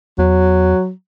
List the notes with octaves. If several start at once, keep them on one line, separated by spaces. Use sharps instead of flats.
E2 F#3